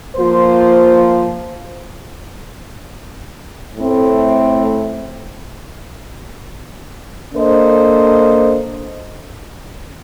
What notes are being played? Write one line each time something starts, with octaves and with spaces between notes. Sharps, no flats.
F3 A#3 F4 C5
A2 A3 C4
A#3 D4 A4 C5 D#5